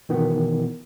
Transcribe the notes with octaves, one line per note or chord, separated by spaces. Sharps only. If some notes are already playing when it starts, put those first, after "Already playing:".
B2 D#3 E3 B3